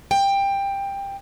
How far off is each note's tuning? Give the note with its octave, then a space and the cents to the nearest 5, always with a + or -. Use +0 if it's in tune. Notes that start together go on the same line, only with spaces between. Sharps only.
G5 +15